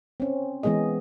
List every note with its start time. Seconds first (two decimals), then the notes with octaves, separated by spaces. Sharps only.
0.20 C4 C#4
0.63 E3 G#3 B3 G#4 D#5